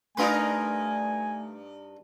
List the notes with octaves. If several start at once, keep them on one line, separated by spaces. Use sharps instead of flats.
G2 A3 D4 D#4 F4 A#4 B4 G#5